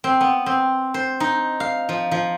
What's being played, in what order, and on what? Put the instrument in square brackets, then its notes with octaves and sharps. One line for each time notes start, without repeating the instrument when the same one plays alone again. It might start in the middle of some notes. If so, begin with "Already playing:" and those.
[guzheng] C4
B3
C4
C5
D#4
F5
F3
F3